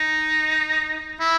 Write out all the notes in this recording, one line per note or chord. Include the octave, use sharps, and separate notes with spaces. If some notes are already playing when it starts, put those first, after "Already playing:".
Already playing: D#4
E4